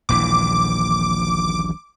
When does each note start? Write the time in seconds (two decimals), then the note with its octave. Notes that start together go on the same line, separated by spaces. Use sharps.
0.09 D#1 A#1 E3 D6